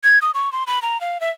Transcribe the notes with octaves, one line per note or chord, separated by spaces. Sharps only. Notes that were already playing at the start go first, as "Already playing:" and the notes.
G#6
D#6
C#6
C6
B5
A#5
F5
E5